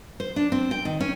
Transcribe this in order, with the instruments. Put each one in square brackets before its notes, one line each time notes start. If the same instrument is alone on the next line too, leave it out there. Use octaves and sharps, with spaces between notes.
[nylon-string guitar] C5
D4
C4
G5
D#3
C#4